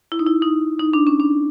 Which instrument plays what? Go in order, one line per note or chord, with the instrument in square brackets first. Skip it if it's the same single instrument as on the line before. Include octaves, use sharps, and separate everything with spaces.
[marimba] E4
D#4
E4
D#4
D#4
D4
C#4
D4